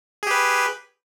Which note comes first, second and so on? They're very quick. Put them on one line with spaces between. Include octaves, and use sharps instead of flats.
G#4 G4 B4